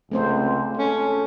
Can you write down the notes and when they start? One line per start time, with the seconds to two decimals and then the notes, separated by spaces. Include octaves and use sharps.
0.11 C#2 A3 C4 C5
0.77 C#4 A4